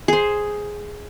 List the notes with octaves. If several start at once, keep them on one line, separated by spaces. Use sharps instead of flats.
G#4 C5